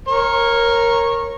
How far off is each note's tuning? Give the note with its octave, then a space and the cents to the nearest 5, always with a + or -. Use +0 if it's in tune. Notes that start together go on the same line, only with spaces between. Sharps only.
A#4 +0 C#5 -20